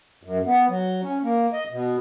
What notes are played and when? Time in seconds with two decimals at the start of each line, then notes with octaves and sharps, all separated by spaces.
0.23 F#2
0.46 B3
0.69 F#3
1.04 C#4
1.23 A#3
1.53 D#5
1.71 B2